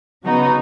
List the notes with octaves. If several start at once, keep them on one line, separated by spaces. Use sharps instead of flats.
C#3 F#3 B3 D#4 F#4